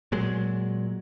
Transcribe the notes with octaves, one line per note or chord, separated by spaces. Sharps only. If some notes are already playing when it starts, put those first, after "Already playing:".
A#2 F#3 G#3